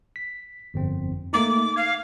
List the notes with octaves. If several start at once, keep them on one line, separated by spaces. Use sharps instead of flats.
B6
G1 F2 C4
A3 A#3 D#4 D6
F5 G#6